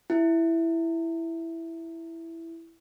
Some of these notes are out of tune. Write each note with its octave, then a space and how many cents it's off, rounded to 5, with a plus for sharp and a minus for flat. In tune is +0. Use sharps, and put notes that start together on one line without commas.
E4 +5